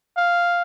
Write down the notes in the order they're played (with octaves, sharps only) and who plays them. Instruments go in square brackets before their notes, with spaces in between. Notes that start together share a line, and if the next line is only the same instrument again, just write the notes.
[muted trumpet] F5